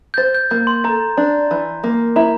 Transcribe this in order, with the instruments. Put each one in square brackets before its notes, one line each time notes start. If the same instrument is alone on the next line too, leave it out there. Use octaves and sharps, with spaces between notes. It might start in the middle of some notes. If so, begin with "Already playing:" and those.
[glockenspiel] G6
[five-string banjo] C5 [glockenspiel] A6
[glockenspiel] G6
[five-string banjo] A#3 [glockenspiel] G6
[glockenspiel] C6
[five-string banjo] A4 [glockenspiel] A#5
[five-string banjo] D4
E3
A#3
[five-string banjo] E4 [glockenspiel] A#5